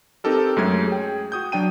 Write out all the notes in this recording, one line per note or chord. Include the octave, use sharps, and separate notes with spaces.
C4 D#4 G4 A4 A#4
F#2 G#3 A3 C#4 G#6
G#4 G5
F#4 D#6 G6
F#3 D4 G5 D#7